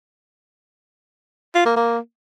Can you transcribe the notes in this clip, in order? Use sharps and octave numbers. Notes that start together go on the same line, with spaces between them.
F4
A#3
A#3